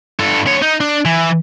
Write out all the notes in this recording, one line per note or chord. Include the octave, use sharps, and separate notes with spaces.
G2 A4
D3 C#5
D#4
D4
E3